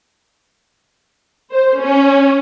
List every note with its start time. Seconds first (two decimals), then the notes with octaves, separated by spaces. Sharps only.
1.51 C5
1.82 C#4